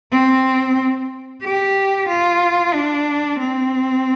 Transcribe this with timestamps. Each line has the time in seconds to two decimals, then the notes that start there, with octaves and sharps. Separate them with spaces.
0.11 C4
1.42 G4
2.08 F4
2.74 D4
3.39 C4